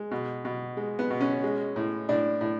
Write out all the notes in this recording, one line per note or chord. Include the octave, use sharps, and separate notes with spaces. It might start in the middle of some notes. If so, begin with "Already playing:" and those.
Already playing: G#3
B2
B2
G#3
B3
B2
C#4
G#3
A2
A2 D4
A2